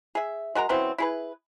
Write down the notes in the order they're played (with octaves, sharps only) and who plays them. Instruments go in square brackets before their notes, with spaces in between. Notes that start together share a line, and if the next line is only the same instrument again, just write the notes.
[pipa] G#4 E5
G#3 F#4 A#4 A#5
C#3 E3 F#3 C4
E4 G#4 B4